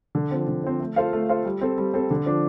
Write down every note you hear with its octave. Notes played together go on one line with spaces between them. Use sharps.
D3
F3 C4
D3
F3 C4
A3
F4 A4 C5 F5
A3
F4 A4 C5 F5
G3
C4 A4
G3
C4 A4
D3
F3 D4